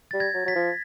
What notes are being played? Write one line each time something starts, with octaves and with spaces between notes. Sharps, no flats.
G3 A6
G#6 A#6
F#3
F#3 A6 B6
F3